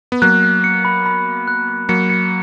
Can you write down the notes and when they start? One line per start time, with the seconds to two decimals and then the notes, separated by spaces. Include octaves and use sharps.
0.12 B3
0.22 F#3 A#3 F#6
0.43 F#6
0.64 C#7
0.85 B5
1.06 B5
1.26 B5
1.47 F#6
1.68 F#6
1.89 F#3 A#3 C#7
2.10 C#7